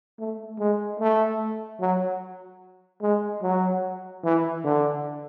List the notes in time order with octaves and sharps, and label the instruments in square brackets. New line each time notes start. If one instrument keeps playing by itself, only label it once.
[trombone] A3
G#3
A3
F#3
G#3
F#3
E3
D3